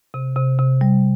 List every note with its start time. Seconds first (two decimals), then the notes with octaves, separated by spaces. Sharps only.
0.14 C3
0.36 C3
0.59 C3
0.81 G3